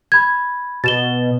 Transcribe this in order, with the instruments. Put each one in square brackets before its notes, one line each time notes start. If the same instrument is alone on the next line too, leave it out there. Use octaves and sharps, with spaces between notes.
[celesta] B5 G#6
[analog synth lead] B2 [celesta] A6 E7 G7